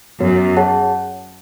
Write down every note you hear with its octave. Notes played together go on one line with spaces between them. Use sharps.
F#2 B3 F#4 C#5
G#4 C#5 F#5 A5